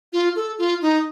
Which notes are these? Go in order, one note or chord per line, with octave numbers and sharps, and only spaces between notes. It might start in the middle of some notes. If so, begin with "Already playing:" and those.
F4
A4
F4
D#4